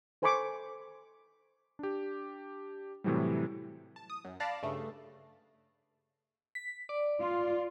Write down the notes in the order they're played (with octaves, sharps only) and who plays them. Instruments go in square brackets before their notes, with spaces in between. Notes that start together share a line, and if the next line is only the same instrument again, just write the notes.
[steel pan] A4 C5 G#5 B5 C#6 D6
[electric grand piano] D4 G4
A2 C3 E3 F#3 G3
[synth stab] A5
D#6
F#2
D5 F5 A5 B5 F#6 A#6
G2 C#3 A3
[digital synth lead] B6
D5
[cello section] F4